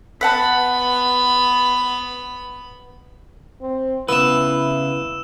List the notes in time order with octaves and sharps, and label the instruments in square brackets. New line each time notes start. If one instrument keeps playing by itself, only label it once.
[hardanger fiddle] B3 B5 [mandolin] B4 F#5 A5
[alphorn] C4
[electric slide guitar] C#3 B4 [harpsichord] B3 [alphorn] E4 [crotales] E6 E7